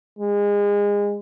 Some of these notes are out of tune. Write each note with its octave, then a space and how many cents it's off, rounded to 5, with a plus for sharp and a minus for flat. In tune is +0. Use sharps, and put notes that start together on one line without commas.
G#3 -30